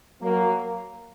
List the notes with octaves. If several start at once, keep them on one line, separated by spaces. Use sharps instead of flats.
F#3 A#3